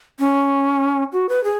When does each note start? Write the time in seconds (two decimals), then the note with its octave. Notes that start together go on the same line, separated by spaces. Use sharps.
0.19 C#4
1.13 F#4
1.29 B4
1.44 G#4